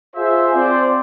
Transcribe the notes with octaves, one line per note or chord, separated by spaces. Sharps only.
F4 G#4 C5 E5
C4 F4 C5 D5